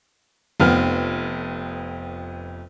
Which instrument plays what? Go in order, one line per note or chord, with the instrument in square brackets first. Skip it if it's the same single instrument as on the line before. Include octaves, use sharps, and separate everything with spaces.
[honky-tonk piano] F1 F2 B3 F6